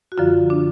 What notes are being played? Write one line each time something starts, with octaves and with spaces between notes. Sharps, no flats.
F#4
F#2 D3 F3 F4
D4